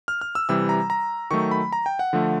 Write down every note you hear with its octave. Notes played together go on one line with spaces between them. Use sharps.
F6
F6
E6
C3 E3 G3 E6
A#5
A#5
D#3 F#3 A3 C#6
B5
A#5
G5
F#5
D3 F3 A3